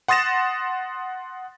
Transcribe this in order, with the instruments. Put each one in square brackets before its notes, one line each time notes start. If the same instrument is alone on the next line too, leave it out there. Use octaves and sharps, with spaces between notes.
[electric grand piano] F#5 C6 D#6 A6 A#6 E7